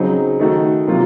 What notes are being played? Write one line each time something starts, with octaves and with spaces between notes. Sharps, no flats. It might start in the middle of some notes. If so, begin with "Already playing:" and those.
Already playing: C#3 F#3 C4 D#4
D#3 A3 D#4 F#4
C3 F#3 A#3 F4